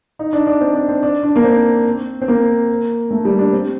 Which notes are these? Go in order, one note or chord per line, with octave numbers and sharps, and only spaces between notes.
D#4
D4
D4
C4
D4
C4
D4
D4
A#3
C4
C4
A#3
A3
G3
D4
C4